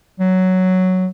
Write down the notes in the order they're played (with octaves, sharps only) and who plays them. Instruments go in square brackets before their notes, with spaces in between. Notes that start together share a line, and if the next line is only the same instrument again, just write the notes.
[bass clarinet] F#3